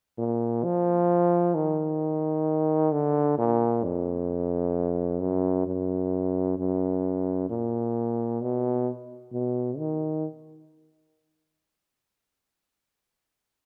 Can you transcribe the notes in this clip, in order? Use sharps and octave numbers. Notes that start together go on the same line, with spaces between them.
A#2
F3
D#3
D3
A#2
F2
F#2
F#2
F#2
A#2
B2
B2
D#3